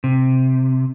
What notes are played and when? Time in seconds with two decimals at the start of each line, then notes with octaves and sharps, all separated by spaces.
0.04 C3